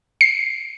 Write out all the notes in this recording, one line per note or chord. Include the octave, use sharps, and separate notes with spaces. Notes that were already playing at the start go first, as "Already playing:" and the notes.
C7